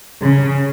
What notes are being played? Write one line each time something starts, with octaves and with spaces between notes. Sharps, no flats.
C#3